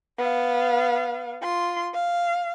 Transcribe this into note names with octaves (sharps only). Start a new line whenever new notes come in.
B3 F5
F4 C6
F5